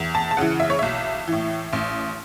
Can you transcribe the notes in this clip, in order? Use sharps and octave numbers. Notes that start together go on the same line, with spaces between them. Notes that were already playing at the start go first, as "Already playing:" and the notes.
Already playing: E2
A5
A5
C#3 E3 F#5
E5
C#5
B1 E5
A2 E3
A1